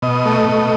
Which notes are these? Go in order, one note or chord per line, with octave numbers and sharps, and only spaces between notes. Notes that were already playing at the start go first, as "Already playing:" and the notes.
B2 D#5
A3
B2